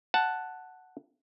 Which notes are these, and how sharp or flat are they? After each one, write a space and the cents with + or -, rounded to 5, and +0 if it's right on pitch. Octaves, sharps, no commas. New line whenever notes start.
F#5 +0 A5 +0